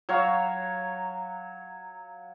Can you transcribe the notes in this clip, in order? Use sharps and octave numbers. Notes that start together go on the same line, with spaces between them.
F#3 C#5 F5